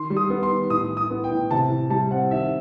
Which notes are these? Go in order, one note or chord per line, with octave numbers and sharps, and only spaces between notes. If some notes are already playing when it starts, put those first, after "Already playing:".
Already playing: D#3 C6
G3
D#6
B3
C6
D#3
A2 D#6
E3
D#6
B3
G5
A2
C3 A5
E3
G3 A5
C4 F#5
D#3 E5